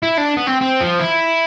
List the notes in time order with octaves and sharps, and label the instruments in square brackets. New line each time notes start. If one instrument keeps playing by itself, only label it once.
[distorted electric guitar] E4
D4
B3
C4
C4
F3
E4